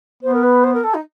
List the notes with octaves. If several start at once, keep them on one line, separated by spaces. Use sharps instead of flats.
B3 C5
A#4
B4
C5
A#4
A4
D#4